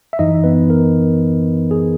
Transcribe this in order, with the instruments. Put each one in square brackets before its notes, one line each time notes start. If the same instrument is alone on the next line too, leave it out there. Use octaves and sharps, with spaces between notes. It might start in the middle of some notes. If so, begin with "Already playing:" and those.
[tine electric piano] E5
F#2 E3 D#4 D#5
B3 B4
A#4
G#4